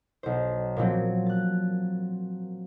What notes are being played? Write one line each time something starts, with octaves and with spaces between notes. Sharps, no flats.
B1 C5
A#2 F3 F#3 C4
F#6 A6